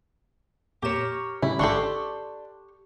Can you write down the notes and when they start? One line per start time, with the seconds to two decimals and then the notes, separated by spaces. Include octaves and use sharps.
0.82 F2 A#2 G4 A#4 C#5 E7
1.42 A2 C#3 G3 E4
1.59 A1 G#2 D3 D4 G4 A4 C6 C#6